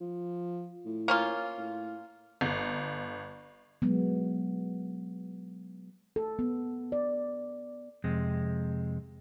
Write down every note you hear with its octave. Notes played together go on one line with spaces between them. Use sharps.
F3
A2
A#3 C#4 F4
A2
G1
F#3 G#3 B3
A4
B3
D5
F2 C3 G#3